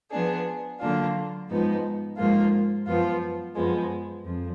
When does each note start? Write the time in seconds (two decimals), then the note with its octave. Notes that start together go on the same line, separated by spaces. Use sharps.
0.11 F3 B3 D4 G#4
0.80 D3 F#3 A#3 D4 F4
1.48 G#2 F3 B3 D#4
2.17 G#2 F3 A#3 F4
2.86 F#2 F3 B3 F4
3.55 F#2 F3 G#3 B3
4.24 F2 F3